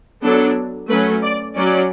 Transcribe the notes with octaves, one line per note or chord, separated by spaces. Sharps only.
F#3 B3 D4 A4
F#3 A3 C#4 B4
D5
F#3 C#4 D5